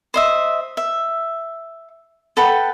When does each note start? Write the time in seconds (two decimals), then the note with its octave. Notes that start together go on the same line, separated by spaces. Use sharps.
0.14 C5 D#5 E5
0.77 E5
2.37 A4 B4 F#5 G5